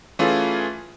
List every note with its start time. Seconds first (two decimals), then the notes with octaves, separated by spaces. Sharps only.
0.19 E3 A3 C#4 F4 G#4